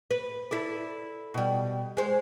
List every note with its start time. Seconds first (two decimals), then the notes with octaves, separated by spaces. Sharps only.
0.11 B4
0.51 E4 A4 D5
1.34 B2 G3
1.97 G#3 C5